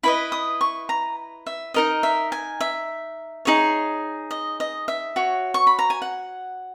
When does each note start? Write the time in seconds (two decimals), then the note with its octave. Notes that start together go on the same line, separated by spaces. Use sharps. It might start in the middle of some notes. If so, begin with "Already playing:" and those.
0.03 E4 B4 D#5 B5
0.32 D#6
0.61 C#6
0.89 A#5
1.46 E5
1.74 D#4 A#4 D#5
2.03 E5
2.32 G#5
2.61 E5
3.45 D#4 G#4 C#5
4.31 D#5
4.60 D#5
4.88 E5
5.16 F#4 C#5
5.54 C#6
5.67 B5
5.79 A#5
5.90 G#5
6.02 F#5